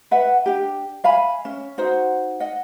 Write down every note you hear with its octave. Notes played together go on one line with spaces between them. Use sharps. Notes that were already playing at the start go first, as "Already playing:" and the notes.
B4 E5 F#5
D4 G4
E5 F5 G#5 B5
C#4
D#4 F#4 C5 F#5
D#5 F#5